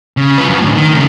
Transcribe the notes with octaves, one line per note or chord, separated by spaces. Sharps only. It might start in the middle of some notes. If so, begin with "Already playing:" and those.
C#3
F4 B4
F#2
A2 D3
D#3
C#3 A3